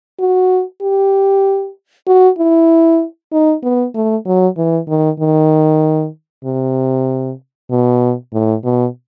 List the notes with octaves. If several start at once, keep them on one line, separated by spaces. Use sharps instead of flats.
F#4
G4
F#4
E4
D#4
B3
A3
F#3
E3
D#3
D#3
C3
B2
A2
B2